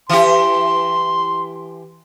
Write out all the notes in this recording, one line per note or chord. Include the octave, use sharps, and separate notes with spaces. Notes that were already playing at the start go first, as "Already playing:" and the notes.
E3 G4 C6